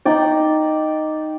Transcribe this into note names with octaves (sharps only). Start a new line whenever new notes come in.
D#4 D5 G5